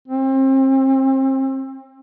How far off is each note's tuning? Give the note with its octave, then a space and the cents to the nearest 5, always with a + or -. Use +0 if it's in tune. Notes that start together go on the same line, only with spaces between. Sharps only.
C4 +35